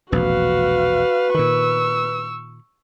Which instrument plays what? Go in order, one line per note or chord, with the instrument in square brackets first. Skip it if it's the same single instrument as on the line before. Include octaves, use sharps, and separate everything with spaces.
[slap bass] E1 A#1 C3 [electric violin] F#4 F5 [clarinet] B4
[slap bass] A#2 D#3 [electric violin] C#6 E6